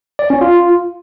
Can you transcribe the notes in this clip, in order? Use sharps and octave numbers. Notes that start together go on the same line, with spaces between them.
D5
C#4
F4